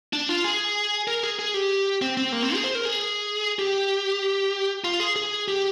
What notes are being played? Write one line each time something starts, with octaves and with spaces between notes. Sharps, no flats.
D4
F4
G#4
A#4
G#4
G#4
G4
C4
C4
A#3
C4
G#4
C5
A#4
G#4
G4
F4
G#4
G#4
G4